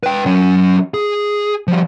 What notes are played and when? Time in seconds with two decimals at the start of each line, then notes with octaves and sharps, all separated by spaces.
0.03 B4 G5
0.26 F#3 C#4
0.94 G#4
1.68 F3 G3